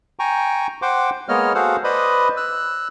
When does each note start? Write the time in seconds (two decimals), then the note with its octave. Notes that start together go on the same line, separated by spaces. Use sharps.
0.19 G5 G#5 A#5 C#6
0.82 C5 F#5 G5 C6 D6
1.29 G#3 A#3 B3 C#5 D#5 F6
1.55 F#4 G#4 A4 C5 F5 F#5
1.84 B4 C5 D5 D#5 B5 D#6
2.37 E6 F#6